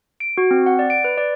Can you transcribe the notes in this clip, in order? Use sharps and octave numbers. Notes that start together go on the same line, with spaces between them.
D7
F#4
C4
F#5
D5
D7
B4
D5